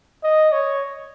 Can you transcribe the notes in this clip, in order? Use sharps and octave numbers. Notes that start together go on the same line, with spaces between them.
D#5
C#5